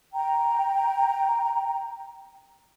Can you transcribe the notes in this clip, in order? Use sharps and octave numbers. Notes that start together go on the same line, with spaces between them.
G5 A#5